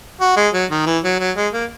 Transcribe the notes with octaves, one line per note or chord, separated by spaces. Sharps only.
F#4
G#3
F#3
D#3
E3
F#3
F#3
G#3
A#3